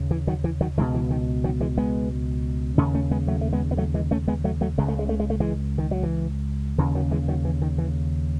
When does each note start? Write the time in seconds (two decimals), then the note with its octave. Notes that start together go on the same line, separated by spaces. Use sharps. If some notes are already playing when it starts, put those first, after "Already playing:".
Already playing: D#2 C#3
0.11 E3
0.27 D#3 F#3
0.44 E3
0.61 D#3 F#3
0.77 C#2 E3 G#3
0.81 B2
0.94 E3
1.11 D#3
1.44 D#3 F#3
1.61 E3 G#3
1.78 G#3 B3
2.78 D#2 C#3 A3 C#4
2.94 A3 C#4
3.11 G#3 B3
3.28 F#3 A3
3.41 A3
3.53 G#3 B3
3.71 B3
3.77 F#3 A3
3.94 E3 G#3
4.11 A3 C#4
4.28 G#3 B3
4.44 F#3 A3
4.61 F#3 A3
4.78 C#2 C#3 G#3
4.88 A3
4.99 G#3
5.09 A3
5.20 G#3
5.30 A3
5.40 E3 G#3
5.78 D#3
5.91 F#3
6.03 E3
6.78 D#2 C#3 E3
6.95 D#3 F#3
7.11 E3 G#3
7.28 D#3 F#3
7.45 E3
7.62 D#3
7.78 E3